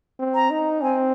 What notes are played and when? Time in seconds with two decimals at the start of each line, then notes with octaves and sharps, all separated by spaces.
0.20 C4
0.35 A#5
0.51 D#4
0.82 C4 G#5